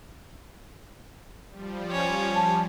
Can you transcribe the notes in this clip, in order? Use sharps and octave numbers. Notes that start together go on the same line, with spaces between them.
F3 G3
C#4 C#5
A5